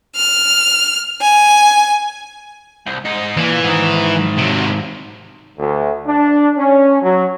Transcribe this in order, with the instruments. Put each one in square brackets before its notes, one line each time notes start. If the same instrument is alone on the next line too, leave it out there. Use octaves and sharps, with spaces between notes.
[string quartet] F6
G#5
[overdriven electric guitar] C2
G#2 D#4
[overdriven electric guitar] A#2 [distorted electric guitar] E3
[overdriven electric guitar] G#2 D#3
[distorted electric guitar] C3 F#3
[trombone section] D2
D4
C#4
F#3